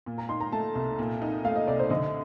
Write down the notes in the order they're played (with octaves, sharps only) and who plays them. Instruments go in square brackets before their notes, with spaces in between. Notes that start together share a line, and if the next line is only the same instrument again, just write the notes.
[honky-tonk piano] A#2
[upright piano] A#5
[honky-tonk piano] D#4 [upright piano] C6
[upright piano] A#5
[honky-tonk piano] A3 [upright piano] A5
[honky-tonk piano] C2
A#2
D#4
[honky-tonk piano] A3 [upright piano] F5
[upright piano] D#5
[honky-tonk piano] C2 [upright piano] D5
[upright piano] C5
[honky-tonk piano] D3 [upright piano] D#5